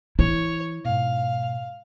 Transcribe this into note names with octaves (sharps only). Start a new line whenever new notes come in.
E3 E4 C#5
G#2 B2 F5